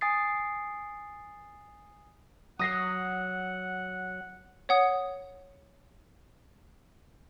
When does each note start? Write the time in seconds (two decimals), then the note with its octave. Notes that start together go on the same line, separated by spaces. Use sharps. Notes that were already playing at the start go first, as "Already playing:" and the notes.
0.01 G#5 D#6 A6 C7
2.59 F#3 F#5 D#6 A#6 C7
4.69 C#5 F#5 D#6